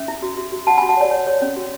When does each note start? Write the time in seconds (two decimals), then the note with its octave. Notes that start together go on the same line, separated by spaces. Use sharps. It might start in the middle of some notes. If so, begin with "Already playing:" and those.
Already playing: C#4 E5
0.08 E4
0.22 F#4
0.37 F#4
0.52 F#4
0.67 F#4 F#5 A5
0.78 F#4 G#5 B5
0.89 F#5 A5
0.97 C#5 D5
1.11 C#5
1.27 C#5
1.42 C#4
1.56 F#4